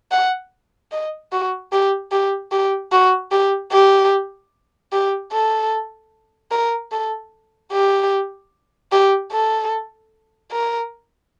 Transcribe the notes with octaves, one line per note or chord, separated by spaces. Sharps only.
F#5
D#5
F#4
G4
G4
G4
F#4
G4
G4
G4
A4
A#4
A4
G4
G4
A4
A#4